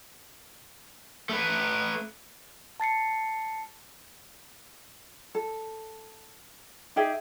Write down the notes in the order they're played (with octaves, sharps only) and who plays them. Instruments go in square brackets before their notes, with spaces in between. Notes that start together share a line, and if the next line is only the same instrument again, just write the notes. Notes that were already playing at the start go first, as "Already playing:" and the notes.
[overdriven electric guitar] A3 B4
[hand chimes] A5 A6 C7 C#7
[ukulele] A4
D#4 G4 G#4 E5